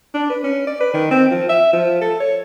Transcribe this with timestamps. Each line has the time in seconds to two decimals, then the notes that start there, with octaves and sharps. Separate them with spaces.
0.14 D4
0.30 B4
0.44 C#4
0.67 D5
0.80 B4
0.94 D#3
1.11 C4
1.31 F3
1.49 E5
1.73 F3
2.01 A4
2.20 C#5